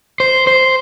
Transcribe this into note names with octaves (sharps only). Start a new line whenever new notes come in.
C5
C5